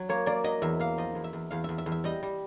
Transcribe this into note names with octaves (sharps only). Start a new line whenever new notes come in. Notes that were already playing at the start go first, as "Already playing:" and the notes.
Already playing: F#3
A#3 C#5
A#3 D5
F#3 D#5
E2 E5
A#3 F5
F3 D#5
E2
E5
E2
E2 F5
E2 E5
E5
E2
E5
G3 D#5
G3